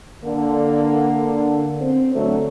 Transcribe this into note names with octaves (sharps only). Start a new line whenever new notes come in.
D3 A#3
C4
D3 F#3 A3